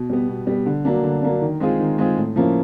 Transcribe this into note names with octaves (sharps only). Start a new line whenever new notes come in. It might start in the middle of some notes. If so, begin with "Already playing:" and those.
Already playing: B2
G3 B3
B2
G3 B3
D3
F#3 A#3 D4
D3
F#3 A#3 D4
D#3
G#3 C4 F4 G#4
D#3
G#3 C4 F4 G#4
A2
F3 A#3 C#4 E4